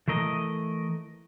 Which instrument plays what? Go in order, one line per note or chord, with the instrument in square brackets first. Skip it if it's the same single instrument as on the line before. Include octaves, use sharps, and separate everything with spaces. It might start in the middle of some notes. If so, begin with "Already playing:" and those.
[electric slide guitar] E3 A3 A#4 D#5